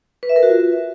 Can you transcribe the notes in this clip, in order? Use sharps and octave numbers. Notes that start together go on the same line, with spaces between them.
B4
E5
A#4
F#4
F4